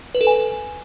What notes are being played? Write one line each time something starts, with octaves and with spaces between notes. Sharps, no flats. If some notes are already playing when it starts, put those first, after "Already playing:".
B4
A4
G#5